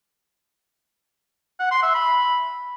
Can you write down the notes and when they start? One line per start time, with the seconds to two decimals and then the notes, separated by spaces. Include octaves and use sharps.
1.59 F#5
1.71 C6
1.83 E5
1.94 B5